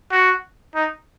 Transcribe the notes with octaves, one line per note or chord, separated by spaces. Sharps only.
F#4
D#4